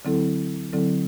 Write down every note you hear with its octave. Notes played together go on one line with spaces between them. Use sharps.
D3 F#3 C4 E4 A4
D3 F#3 C4 E4 A4